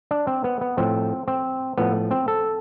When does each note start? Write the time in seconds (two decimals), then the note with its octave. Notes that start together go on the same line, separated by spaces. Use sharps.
0.11 D4
0.27 C4
0.44 B3
0.61 B3
0.77 A2 F3 C4
1.28 C4
1.78 A2 F3 B3
2.11 C4
2.28 A4